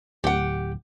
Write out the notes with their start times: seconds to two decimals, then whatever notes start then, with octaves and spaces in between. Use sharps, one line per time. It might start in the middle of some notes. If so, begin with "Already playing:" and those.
0.24 D1 G4 F#5